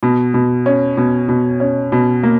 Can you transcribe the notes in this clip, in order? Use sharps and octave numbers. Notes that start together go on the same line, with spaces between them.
B2
B2
C#4
B2
B2
C#4
B2
A#3